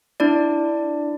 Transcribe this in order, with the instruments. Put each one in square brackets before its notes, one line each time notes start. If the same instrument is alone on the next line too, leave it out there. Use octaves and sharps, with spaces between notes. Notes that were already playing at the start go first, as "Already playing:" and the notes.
[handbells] D4 E4 D5